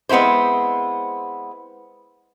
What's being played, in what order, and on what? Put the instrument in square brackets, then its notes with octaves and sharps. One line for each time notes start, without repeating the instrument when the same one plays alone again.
[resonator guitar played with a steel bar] G#3 B3 C4 E4 C5